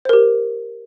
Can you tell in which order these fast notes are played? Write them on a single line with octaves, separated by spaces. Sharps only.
C5 A#4 G4